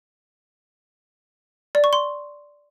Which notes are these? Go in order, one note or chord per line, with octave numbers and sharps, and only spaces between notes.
D5
C#6
C6